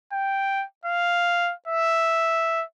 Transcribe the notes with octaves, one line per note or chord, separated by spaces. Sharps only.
G5
F5
E5